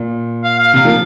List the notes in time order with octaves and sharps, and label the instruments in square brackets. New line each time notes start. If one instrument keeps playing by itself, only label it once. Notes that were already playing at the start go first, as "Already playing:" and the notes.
Already playing: [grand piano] A#2
[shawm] F5
F5
[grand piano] C3 [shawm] F5
[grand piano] F3 A#3